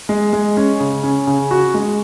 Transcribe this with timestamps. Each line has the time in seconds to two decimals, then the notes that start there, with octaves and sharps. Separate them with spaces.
0.09 G#3
0.33 G#3
0.57 C#4
0.80 C#3
1.03 C#4
1.27 C#3
1.51 F#4
1.74 G#3